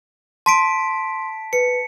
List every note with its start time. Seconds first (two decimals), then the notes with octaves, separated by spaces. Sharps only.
0.46 A5 C6 B6 D7
1.53 B4 C#7